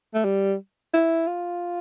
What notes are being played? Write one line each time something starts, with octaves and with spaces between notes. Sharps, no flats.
A3
G3
E4
F4